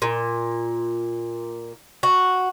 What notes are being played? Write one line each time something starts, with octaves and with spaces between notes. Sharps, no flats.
A#2
F#4